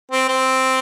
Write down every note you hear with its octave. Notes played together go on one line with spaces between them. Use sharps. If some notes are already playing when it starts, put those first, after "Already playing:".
C4
C4